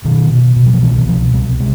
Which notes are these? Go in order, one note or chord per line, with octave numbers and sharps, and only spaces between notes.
B2 D#3
B2
B2
F#3
F3
C2 E3
E3
B2 F3
C2 G3
C3 G#3